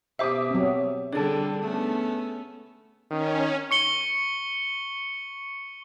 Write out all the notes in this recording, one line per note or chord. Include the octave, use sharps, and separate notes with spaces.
B2 G4 C5 E5 D6 D#6
F#3 C4
D3 G3 D4 G#4 A4 A5
A3 B3 C#4
D#3 C#4
C#6 C#7 G7